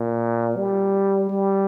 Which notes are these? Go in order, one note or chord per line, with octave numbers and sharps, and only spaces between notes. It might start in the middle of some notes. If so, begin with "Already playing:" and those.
Already playing: A#2
G3
G3